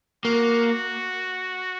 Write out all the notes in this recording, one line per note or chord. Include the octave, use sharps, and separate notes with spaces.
A#3 F#4